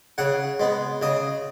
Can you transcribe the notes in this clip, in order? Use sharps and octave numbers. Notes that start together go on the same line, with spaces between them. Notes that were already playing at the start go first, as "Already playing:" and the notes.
C#3 F#5
G#3 B3
C#3 D#5